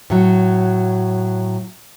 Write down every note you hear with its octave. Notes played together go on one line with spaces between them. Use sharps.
A2 F#3